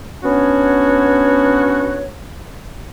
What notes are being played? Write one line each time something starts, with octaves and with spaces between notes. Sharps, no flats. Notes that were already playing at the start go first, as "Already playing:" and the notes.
B3 C#4 D4 F#4 C#5